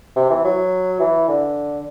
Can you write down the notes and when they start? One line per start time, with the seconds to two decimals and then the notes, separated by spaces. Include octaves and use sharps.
0.16 C3
0.30 E3
0.44 F#3
1.00 E3
1.28 D3